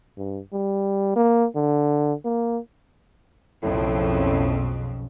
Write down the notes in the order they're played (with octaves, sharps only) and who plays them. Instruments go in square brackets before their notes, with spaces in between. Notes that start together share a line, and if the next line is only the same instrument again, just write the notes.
[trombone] G2
G3
A#3
D3
A#3
[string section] B1 [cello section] F2 C#3 [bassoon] A2